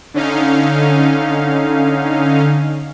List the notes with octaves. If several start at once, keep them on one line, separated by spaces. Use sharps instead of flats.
D3 C#4 D#4 F5